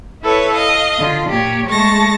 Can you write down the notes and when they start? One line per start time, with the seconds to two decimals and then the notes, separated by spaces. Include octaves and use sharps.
0.22 E4 A4 B4 C#5
0.54 D#5 F5
0.99 D3 F4
1.30 A#2 A#3 G4 C#5
1.69 G#3 A3 A5 C#6 A6 A#6